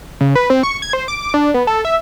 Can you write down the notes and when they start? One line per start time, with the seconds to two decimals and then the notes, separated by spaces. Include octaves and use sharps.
0.21 C#3
0.35 B4
0.50 C4
0.63 C#6
0.82 G#6
0.93 C5
1.08 D6
1.34 D4
1.54 B3
1.67 A4
1.85 E5